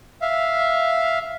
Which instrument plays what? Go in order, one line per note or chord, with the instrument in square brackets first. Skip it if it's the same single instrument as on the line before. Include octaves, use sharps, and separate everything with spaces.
[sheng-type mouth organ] E5 F5